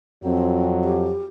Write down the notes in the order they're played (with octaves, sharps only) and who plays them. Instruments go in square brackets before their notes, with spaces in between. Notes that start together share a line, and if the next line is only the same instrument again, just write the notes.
[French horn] F2 [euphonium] F#3 [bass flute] C4
[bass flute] G4